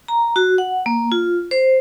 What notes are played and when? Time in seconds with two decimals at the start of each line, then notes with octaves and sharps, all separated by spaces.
0.08 A#5
0.36 F#4
0.58 F#5
0.86 A#3
1.12 F4
1.51 C5